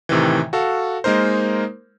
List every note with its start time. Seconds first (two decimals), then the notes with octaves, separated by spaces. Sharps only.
0.09 A2 C3 D#3 E3
0.53 F#4 A4 F5
1.04 G#3 A#3 D#4 A#4 C5